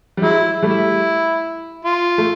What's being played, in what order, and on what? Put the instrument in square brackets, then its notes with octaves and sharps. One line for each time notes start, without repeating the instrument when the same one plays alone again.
[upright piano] G3
[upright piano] F#3 G#3 [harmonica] E4
[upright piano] G3 A3 [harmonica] E4
[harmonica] F4
[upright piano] A3